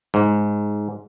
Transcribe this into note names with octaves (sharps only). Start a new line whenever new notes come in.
G#2